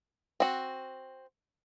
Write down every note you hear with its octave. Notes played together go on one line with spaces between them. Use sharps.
C4 F#4